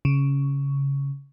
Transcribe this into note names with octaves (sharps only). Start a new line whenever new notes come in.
C#3